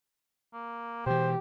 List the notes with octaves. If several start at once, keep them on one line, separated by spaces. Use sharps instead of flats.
A#3
B2 E3 G4 C5